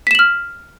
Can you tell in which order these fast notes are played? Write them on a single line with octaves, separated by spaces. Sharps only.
B6 E7 F#7 F6